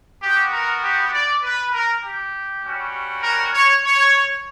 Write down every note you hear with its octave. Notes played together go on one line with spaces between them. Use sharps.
B3 F#4 G4
A#4
G4
D5
B4
A#4
G4
G3 C#4 F#4
A#4
C#5
C#5